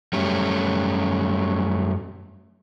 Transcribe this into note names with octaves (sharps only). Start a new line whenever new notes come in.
F#2 G3 A3 C#4